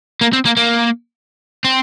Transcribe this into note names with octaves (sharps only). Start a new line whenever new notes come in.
A#3
C4
A#3
A#3
C4